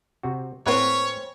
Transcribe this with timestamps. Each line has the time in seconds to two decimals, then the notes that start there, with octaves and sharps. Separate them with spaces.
0.23 C3 C4 F#4
0.66 A2 A#3 C4 C#4 B4 C#5